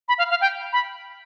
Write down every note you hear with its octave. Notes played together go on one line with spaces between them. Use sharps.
B5
F5
F5
G5
B5